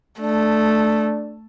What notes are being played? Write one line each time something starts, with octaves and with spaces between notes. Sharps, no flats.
A3 D4